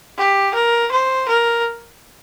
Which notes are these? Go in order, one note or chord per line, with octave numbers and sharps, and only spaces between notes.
G4
A#4
C5
A#4